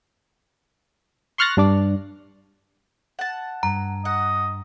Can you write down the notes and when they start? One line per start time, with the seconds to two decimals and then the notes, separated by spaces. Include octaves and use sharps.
1.38 C6 C#6 F6 F#6 A6 A#6
1.57 G2 D4 D5
3.19 F#5 A5
3.63 G2 A#5
4.05 D#5 F#5